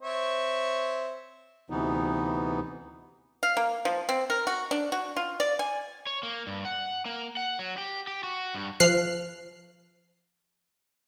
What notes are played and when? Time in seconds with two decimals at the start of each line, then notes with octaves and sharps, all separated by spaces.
0.01 C4 C#5 E5
1.70 D2 C3 E3 B3 D#4
3.43 F5
3.57 A#3
3.85 F3
4.09 C4
4.30 A#4
4.47 F#4
4.71 D4
4.92 F#4
5.16 F4
5.40 D5
5.59 G#5
6.07 C#5
6.23 A#3
6.47 G2
6.65 F#5
7.05 A#3
7.37 F#5
7.59 F#3
7.78 G4
8.07 G4
8.23 F#4
8.55 G2
8.80 F3 F6 F#6 C7